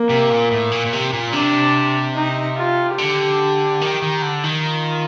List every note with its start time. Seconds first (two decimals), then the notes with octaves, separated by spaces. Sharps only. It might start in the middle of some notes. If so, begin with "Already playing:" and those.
Already playing: A#3
0.10 C3
0.30 A#2
0.51 A2
0.71 A#2
0.86 A#2
0.93 C3
1.13 A#2
1.33 C3 D4
2.16 D#4
2.57 F4
2.98 D3 G4
3.82 D#3
4.02 D#3
4.22 D3
4.43 D#3
4.64 F4